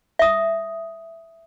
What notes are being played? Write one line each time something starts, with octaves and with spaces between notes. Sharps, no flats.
E5 D#6